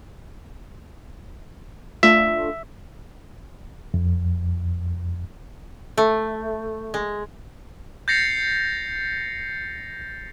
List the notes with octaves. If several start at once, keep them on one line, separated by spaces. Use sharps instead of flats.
A3 D4 F4 E5
F2
A3
G#3
G6 A6 A#6 C7 C#7 F7